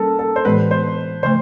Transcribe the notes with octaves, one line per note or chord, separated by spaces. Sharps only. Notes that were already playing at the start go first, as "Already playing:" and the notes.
Already playing: G3 A#3 C#4 A4 A#4
A4
C5
A2 E3 G#3 B3 B4
C5
C#3 F3 A3 C5